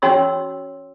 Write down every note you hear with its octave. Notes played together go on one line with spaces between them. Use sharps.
C#4 F#4 C#5 C6 E6